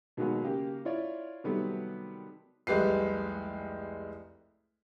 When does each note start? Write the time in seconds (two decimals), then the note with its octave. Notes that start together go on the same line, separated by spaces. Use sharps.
0.17 B2 D#3 F#3 G#3 A#3 B3
0.44 C#3 A#3 G4
0.85 E4 F4 C#5 D5
1.44 C3 D#3 F#3 G3 A3 B3
2.67 F1 C2 G#3 G4 B4 C7